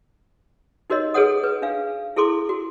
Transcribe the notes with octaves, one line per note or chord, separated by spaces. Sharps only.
D#4 F#4 A#4 C#5 D#5
G#4 A4 B4 C#5 F#5 D#6
B4
D4 F5
E4 G#4 A4 C6 D6
F#4